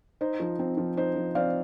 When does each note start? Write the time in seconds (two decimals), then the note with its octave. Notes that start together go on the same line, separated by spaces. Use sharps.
0.21 D#4 C5
0.40 F3
0.59 C4
0.77 F3
0.97 D#4 C5
1.16 F3
1.35 C4 D5 F5